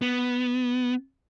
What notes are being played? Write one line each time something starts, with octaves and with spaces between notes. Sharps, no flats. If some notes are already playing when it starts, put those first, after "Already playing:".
B3